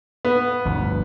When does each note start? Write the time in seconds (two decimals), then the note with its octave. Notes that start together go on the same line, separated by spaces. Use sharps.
0.25 B3
0.65 G1 D2 F3